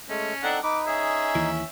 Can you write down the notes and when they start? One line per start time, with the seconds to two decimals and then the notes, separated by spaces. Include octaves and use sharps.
0.09 G#3 A3 C#4
0.43 C4 D4 D#4 A4 F#5
0.63 D#4 B4 D6
0.87 C#4 G#4 E5
1.35 D#2 E3